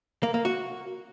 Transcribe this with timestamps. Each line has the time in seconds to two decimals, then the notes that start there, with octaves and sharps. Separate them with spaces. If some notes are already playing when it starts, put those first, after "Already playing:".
0.23 A#3
0.34 A#3
0.45 F#4